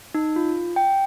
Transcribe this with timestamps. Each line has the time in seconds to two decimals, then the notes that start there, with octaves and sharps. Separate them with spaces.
0.14 D#4
0.36 F4
0.76 G5